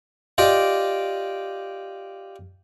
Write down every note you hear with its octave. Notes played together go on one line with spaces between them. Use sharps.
F4 G4 D5 D#5